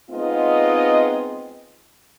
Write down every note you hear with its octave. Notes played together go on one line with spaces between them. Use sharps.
G#3 B3 C4 D#4 F4 D#5